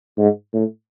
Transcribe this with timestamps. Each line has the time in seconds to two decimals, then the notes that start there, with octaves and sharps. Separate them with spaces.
0.18 G#2
0.53 A2